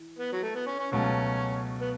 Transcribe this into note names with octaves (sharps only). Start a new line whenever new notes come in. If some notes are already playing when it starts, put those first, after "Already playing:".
Already playing: E3
B3
F#3
A3
B3
C#4
C#4
C#2 B2 F#3 A3 C#4
B3